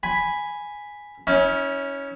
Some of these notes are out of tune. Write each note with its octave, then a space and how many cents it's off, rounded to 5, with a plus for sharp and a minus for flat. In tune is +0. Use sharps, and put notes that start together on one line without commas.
G#5 +0 B5 +0
C#4 +5 E4 -40